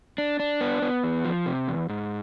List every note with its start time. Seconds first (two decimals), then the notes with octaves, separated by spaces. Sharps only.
0.18 D4
0.40 D4
0.61 B3
0.82 B3
1.04 E2
1.25 F3
1.46 C3
1.68 E2
1.89 G#2